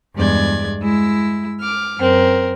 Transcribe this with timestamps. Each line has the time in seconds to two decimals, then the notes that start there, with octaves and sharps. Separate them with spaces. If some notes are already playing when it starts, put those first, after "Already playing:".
0.15 E2 G2 G#3 D5 G#6
0.81 G#3 E4 E6
1.59 D6 F6
1.98 F#2 C4 A#4